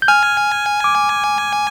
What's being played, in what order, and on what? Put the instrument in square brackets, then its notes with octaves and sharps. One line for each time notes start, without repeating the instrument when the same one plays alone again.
[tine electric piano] G6
[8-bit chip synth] G#5 [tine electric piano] F6
[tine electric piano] D6